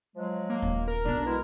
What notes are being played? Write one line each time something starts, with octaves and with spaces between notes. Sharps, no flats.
F3 F#3 G#3
A#3
D#1
A#4
B1 B3 D4
B2 G#3 E4